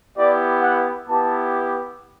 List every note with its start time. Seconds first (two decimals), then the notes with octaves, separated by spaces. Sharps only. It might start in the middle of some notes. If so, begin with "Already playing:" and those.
0.17 B3 E4 G4 D5
0.62 F#5
1.07 B3 E4 G4 A5